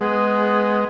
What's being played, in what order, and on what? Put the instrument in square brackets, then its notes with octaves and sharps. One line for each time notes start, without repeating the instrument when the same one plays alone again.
[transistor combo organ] G#3 [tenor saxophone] B3 [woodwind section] G#4